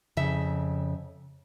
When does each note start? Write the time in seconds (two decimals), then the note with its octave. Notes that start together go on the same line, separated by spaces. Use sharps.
0.17 F2 C#3 E5